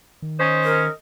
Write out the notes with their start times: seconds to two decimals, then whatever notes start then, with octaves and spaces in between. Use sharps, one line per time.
0.22 D#3
0.39 C#4 C5 D#5
0.65 A#4